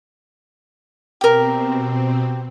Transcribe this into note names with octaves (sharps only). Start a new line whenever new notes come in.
B2 C4 G4 A#4